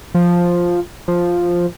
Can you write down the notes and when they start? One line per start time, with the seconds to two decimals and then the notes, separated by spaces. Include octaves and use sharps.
0.14 F3
1.08 F3